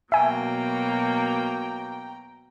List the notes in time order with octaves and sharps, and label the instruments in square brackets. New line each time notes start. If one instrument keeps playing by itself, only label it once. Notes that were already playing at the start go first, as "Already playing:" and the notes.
[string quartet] B2 F#3 A#3 [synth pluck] E5 G#5 [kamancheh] G5 A#5